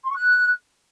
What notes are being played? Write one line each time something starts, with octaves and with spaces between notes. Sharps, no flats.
C6
C#6
F#6